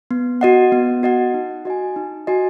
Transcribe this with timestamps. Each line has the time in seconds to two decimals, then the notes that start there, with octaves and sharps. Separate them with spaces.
0.11 B3
0.41 F#4 D#5 F#5
0.72 B3
1.03 F#4 D#5 F#5
1.34 D#4
1.65 F#4 D#5 G#5
1.96 D#4
2.27 F#4 D#5 G#5